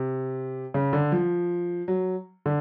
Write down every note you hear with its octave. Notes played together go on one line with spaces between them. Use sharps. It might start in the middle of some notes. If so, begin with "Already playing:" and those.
Already playing: C3
C#3
D3
F3
F#3
D3